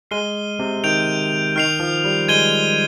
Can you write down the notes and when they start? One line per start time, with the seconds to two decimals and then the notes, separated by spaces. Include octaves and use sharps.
0.11 G#3 F6 C7 D#7 G7
0.59 C3
0.84 D#3 G6 D7 F7
1.56 D#3 F6 C7 F7
1.80 F3
2.04 G3
2.28 G#3 G#6 D#7 G7